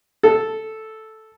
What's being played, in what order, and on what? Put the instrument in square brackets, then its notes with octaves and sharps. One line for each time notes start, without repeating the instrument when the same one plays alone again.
[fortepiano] A4